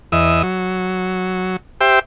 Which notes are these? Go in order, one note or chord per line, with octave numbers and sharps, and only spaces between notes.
E2 D#5 E5
F#3
G4 C5 E5 G5